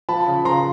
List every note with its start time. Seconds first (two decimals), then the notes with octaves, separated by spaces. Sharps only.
0.09 F3 A5 B5
0.27 C#3
0.45 F3 A#5 C6